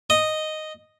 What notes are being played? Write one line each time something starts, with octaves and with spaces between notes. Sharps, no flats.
D#5